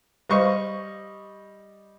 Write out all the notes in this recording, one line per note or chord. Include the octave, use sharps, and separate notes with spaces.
G3 B4 C5 D#5 F5 C#6